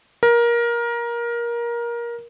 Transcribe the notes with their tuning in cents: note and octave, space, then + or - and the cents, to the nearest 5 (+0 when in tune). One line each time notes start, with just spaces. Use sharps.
A#4 +20